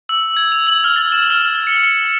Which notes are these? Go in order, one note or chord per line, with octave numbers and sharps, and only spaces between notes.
E6
G#6
F7
F#7
F6
A6
E7
F6
F6
C#7
C#7